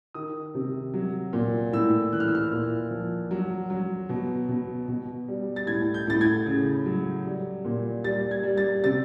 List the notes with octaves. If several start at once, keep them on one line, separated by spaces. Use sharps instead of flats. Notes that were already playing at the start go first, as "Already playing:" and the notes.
D#3 D#6
C3
F#3
A#2
A2 E6
E3 F#6
F6
E6
F6
A#2
F3
F#3
F#3
B2
B2
B2
G3
A6
A2 G#6
G6
A2 A6
G#6
C#3
F#3
G3
A#2
G3 A6
G#6
G3
A6
C3 A6